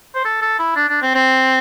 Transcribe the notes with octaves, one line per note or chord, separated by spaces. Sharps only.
C5
A4
A4
E4
D4
D4
C4
C4